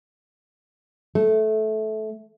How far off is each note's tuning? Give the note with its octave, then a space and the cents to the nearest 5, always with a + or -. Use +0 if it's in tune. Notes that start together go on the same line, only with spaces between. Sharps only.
A3 -15